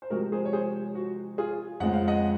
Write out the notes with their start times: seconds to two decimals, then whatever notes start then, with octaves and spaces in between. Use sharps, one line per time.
0.02 C5
0.10 C3 F3 G#3 F#4 A#4
0.32 G#4 C5
0.45 C#5
0.53 G#4 C5
0.95 F#4
1.38 F4 G#4
1.80 F2 C#3 F3 G#3 F#5
1.94 F5
2.08 D#5 F#5